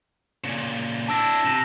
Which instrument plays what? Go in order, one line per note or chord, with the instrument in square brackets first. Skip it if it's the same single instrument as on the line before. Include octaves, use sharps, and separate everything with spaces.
[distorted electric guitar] A#2 C#3
[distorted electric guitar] D4 E4 [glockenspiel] A5 E6 A#6
[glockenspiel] A#6
[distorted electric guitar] C3 [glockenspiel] A#6 E7